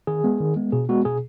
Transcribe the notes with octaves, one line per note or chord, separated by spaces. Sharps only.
D#3 G#4
G#3 B3
D#3
G#3 B3
B2 G#4
G#3 B3 F#4
B2 G#4